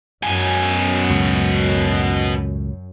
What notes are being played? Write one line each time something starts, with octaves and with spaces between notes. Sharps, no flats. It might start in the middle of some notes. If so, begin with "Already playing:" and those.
F#2 B2 G#5
C#2 A2